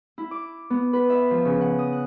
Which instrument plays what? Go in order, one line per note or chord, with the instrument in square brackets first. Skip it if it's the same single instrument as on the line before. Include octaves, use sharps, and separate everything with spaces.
[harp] E4
D6
B3
B4
E5
F3
C#3
F#5
D#6
F#6